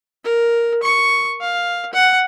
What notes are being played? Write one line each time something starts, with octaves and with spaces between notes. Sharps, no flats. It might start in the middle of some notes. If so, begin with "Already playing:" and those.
A#4
C#6
F5
F#5